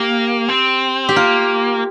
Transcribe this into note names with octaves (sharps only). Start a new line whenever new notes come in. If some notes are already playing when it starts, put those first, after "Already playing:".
Already playing: A#3 G4
C4
G4
A#3 F4